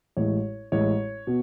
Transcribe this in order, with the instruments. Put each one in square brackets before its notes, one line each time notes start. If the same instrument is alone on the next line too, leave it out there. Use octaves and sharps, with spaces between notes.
[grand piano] A1 A2 G#3 C#5
A1 A2 G#3 C#5
B2